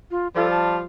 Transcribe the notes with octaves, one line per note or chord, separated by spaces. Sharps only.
F4
F3 G3 F4 A4
A5